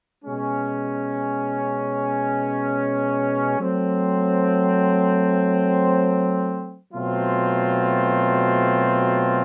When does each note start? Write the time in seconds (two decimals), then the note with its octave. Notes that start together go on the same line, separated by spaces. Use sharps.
0.25 B2 G#3 C#4
3.59 F#3 A3 C4
6.94 B2 F#3 A3 C4 F4